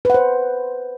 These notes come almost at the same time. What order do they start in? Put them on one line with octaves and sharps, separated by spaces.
B4 F#5 C5